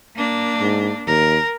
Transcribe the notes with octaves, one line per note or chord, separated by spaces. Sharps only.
A#3 D4
G#2
D#2 A#4